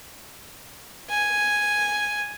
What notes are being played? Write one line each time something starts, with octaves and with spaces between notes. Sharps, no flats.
G#5